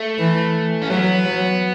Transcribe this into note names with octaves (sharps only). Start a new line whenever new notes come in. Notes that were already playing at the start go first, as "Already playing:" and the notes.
Already playing: A3
E3
C#4
F#3 B3
F#3